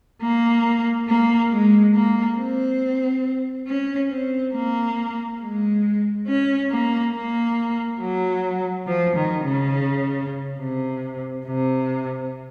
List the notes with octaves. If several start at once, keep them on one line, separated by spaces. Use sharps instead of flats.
A#3
A#3
G#3
A#3
C4
C#4
C4
A#3
G#3
C#4
A#3
A#3
F#3
F3
D#3
C#3
C3
C3